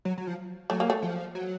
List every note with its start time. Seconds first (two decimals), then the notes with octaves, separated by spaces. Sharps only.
0.05 F#3
0.18 F#3
0.27 F3
0.70 F#3 A3
0.80 A#3
0.90 A3
1.02 F3
1.35 F#3